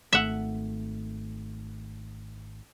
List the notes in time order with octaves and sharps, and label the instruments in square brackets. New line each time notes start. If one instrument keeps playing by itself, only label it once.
[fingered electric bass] G#1 A3 [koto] E5 F#5